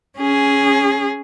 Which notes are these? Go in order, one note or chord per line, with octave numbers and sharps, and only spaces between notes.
C#4 G#4